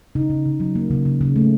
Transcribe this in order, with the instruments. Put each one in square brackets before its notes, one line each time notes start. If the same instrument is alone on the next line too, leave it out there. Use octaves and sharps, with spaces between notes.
[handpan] C#3 D#4
C#3
C#3
F#3
A#3
C#3
C#3
C#3
A3